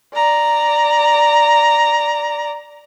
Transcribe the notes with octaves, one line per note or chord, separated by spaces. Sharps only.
D5 A#5